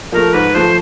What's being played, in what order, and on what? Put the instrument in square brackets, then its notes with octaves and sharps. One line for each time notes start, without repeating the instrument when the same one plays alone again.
[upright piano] F3 A3 [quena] A#4
[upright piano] G#2 [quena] B4
[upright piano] F3 A3 [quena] C5